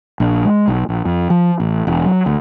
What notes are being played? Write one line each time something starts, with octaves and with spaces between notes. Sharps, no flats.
A#1
G#3
B1
A#1
F2
F3
A1
E1
F#3
D2